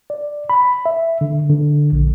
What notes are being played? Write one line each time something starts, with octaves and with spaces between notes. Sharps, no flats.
D5
B5
E5
D3
D3
A#1